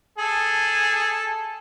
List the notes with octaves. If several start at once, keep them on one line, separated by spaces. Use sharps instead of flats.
G#4 A4